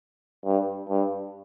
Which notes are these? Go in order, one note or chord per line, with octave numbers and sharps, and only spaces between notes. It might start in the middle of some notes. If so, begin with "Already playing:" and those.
G2
G2